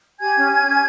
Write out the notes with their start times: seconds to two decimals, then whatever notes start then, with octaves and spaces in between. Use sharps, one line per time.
0.20 G4 G#5 G#6
0.35 C#4
0.51 C#4
0.67 C#4